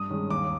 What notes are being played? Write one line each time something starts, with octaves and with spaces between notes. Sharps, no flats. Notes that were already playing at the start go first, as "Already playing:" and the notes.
Already playing: G2 D#6
D#3 G#3 C#4
D#2 D6